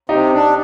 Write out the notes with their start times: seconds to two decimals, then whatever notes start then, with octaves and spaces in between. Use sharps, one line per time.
0.09 C3 D#4 G4
0.33 D4